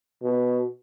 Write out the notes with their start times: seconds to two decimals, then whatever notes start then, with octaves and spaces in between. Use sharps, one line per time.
0.23 B2